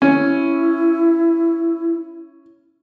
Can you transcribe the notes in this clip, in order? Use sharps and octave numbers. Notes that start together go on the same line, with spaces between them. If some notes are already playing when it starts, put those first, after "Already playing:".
C#4 E4